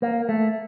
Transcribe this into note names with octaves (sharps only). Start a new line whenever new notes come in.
A#3
A3